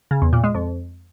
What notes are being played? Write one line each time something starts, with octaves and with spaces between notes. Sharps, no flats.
C#3
E2
A#2
G#3
F2